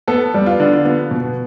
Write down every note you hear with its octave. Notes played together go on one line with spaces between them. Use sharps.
B3 A4
G3
F4
D3
B3
B2